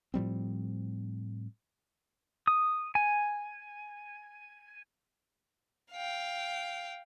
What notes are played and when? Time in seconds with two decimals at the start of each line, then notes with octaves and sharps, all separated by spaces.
0.14 A2 F3 G3 C4
2.47 D#6
2.95 G#5
5.93 F5 G5